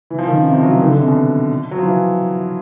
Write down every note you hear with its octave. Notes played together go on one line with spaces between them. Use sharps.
E3
F3
D#3
C#3
C3
F3
F#3
E3
D#3
D3
C3
B2
F#3
F3
E3